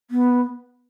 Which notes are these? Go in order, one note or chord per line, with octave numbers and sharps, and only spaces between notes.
B3